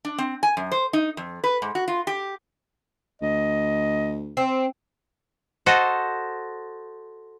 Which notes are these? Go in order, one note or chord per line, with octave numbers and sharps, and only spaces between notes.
D4
C4
G#5
F#2
C5
D#4
F2
B4
G#2
F#4
F4
G4
D2 D#5
C4
F#4 A4 C5 D#5